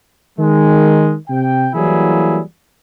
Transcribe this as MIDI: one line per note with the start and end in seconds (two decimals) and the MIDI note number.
0.39 1.15 51
0.39 1.15 56
1.29 1.69 48
1.29 1.69 79
1.74 2.41 52
1.74 2.41 54
1.74 2.41 55
1.74 2.41 58
1.74 2.41 64
1.74 2.41 68